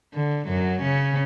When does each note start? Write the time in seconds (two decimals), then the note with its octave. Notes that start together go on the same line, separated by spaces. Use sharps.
0.14 D3
0.48 F#2 F#3
0.82 C#3 C#4